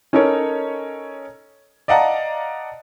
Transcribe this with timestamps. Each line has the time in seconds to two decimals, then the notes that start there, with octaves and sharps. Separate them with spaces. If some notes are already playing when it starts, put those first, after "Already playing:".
0.13 C#4 D#4 A4 A#4 C#5
1.88 D5 D#5 F5 F#5 A5 A#5